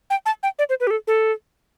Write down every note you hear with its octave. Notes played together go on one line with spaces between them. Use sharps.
G5
A5
G5
D5
C5
B4
G4
A4
A4